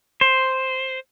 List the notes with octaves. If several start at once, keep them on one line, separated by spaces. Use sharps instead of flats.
C5